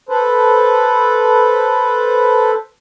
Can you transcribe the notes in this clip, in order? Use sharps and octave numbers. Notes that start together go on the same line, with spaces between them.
A4 B4 C5